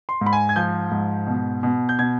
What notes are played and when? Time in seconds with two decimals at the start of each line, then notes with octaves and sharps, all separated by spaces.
0.09 C6
0.21 G#2
0.26 B5
0.33 G#5
0.49 G#6
0.56 F3 G6
0.91 G#2
1.27 B2
1.63 B2
1.89 G6
1.99 B2 G#6